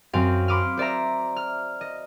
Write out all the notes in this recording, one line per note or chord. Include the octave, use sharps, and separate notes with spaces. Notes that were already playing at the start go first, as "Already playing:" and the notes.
F#2 C4 F5
B5 C6 D6 D#6 F6
C5 D5 E5 A#5
F6
D#5